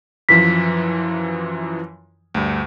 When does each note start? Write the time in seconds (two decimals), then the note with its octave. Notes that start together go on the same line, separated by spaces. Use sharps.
0.29 F#2 E3 F3 B6
2.35 D2 G2